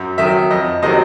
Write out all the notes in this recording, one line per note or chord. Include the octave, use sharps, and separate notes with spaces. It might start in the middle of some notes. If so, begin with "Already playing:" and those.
Already playing: F#2
D#3 F#3 E5
F2 D#5
C3 D#3 F#3 D#5